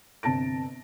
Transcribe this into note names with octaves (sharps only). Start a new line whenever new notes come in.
G1 C3 A5 A#6 D7